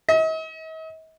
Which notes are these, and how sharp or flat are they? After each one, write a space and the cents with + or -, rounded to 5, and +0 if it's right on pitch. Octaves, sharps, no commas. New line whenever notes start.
D#5 +45